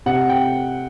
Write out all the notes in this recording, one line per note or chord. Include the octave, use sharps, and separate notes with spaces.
C3 F#5
G5